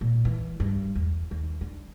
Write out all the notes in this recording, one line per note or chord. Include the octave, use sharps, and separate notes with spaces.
A#2
E3
G2
E2
D#2
D3